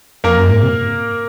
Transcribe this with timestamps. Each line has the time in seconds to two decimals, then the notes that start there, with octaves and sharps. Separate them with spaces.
0.24 F2 A#3 A#4
0.37 F#2
0.50 G#2
0.63 C3